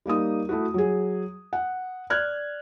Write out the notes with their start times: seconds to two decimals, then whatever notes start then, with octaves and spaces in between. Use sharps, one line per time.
0.06 G3 A#3 D#4 D#6
0.49 A3 E4 F#4
0.74 F#3 G#4
1.53 F#5
2.10 D5 F6 F#6 G#6